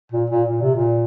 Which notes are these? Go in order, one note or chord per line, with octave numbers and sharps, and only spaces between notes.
A#2
A#2
A#2
C3
A#2